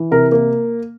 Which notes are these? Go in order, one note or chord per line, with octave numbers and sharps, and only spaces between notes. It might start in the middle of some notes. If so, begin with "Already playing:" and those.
Already playing: E3
C3 A#4
A#3